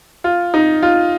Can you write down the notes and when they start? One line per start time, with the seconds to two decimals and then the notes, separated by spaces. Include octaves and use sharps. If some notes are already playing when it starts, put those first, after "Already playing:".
0.24 F4
0.54 D#4
0.83 F4